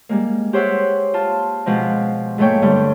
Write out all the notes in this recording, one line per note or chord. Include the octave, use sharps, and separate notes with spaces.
G3 G#3 A#3
G4 G#4 C5 C#5 E5 F#5
F4 A5
B2 F3 G#3 C4
G#2 F3 A3 A#3 C#5 G5
G2 D3 G3 G5